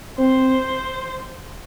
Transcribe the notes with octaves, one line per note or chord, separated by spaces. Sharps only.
C4 C5